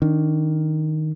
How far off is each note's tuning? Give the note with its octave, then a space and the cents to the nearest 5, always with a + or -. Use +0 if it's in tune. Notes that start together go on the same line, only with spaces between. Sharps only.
D#3 +0 D4 -25